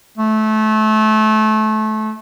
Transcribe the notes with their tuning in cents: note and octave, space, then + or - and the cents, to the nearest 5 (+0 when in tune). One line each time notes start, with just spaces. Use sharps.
A3 -25